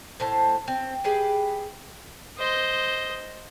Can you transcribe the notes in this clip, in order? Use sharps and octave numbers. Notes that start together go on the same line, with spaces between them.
A2 C5 A5
C4
G4 G#4 B4
C5 D#5